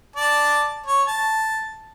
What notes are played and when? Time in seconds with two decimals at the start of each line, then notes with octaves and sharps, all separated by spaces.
0.16 D5 A5
0.86 C#5
1.07 A5